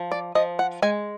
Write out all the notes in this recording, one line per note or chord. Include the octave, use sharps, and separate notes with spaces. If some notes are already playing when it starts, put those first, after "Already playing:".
Already playing: F3
D5
F3 D#5
F#5
G#3 G#5